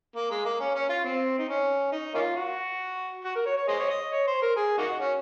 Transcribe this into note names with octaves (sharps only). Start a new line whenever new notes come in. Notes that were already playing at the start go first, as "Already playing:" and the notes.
A#3
G#3
A#3
C#4
C#4
F4
C4
D#4
C#4
D#4
A#3 C#4 F4
F#4
F#4
A#4
C#5
C#5
G#4 C5 D#5
C#5
D#5
C#5
C5
A#4
G#4
A#3 D#4 F#4
C#4